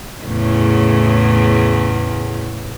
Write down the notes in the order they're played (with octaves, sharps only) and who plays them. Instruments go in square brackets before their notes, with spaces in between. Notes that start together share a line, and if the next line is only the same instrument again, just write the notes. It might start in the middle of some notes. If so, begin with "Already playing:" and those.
[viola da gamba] E2 A2 C#3